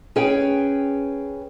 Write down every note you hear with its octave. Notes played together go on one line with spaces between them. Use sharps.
C#4 G#4 B4 G5